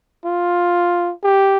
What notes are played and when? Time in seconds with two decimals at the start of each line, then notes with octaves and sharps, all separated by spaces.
0.25 F4
1.23 G4